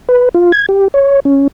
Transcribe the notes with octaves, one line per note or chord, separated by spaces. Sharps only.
B4
F4
G#6
G4
C#5
C#4